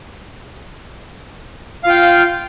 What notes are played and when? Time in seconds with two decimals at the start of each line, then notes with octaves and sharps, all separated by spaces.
1.84 F5
1.87 F4
1.89 G5